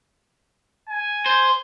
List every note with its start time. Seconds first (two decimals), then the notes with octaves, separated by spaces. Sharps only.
0.89 G#5
1.26 C5